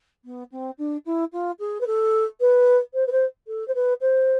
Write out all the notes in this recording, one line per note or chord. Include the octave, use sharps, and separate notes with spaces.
B3
C4
D4
E4
F4
G#4
B4
A4
B4
C5
B4
C5
A4
C5
B4
C5